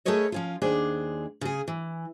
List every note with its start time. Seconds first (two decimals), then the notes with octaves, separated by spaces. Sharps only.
0.05 A3 G#4 A#4 B4 C#5 D#5
0.32 F3 C#4 F4
0.62 D#2 D4 G#4 C5
1.41 C#3 G#4
1.68 E3